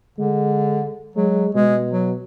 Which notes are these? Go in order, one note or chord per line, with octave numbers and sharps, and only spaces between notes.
D3 G#3
F#3 G#3
B2 G#3
F#3